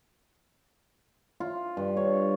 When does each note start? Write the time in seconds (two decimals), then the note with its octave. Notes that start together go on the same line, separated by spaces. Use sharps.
1.40 F4
1.77 G2
1.97 C#5